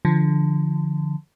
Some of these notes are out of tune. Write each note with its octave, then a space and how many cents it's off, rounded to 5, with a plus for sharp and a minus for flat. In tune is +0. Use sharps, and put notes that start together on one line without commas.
D3 +0 F3 -25